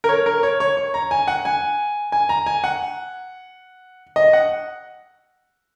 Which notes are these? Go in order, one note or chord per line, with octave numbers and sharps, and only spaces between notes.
A#4
C#5
A#4
C#5
C#5
C#5
A#5
G#5
F#5
G#5
G#5
A#5
G#5
F#5
D#5
F#5